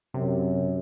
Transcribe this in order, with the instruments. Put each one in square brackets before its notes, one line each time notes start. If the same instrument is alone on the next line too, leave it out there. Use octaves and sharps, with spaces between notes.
[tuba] F#2 [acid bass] C3